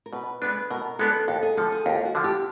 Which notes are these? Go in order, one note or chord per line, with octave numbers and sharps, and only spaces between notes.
A#4
B2 B4
G#3 B3 D4 B4
B2 A#4
G#3 B3 D4 A4
D#2 A4
G#4
D3 F3 A4
G#4
D#2 F4
F#4
D3 F3
G4